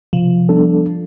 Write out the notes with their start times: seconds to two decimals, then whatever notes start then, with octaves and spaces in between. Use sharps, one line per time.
0.13 C3 F3
0.49 G3 B3 D4 A4